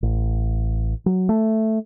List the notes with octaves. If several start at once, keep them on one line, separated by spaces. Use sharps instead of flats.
A1
F#3
A3